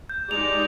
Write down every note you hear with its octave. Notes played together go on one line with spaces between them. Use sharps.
G6
G#3 D#4 G4 D5 F7